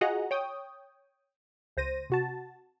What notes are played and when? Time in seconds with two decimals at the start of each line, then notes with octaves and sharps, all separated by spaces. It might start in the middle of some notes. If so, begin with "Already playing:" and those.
0.01 F4 F#4 G#4 D#5 F#5 A#5
0.31 C#5 G5 D#6
1.77 C#2 C5 A#6 D#7
2.10 C3 F#4 A5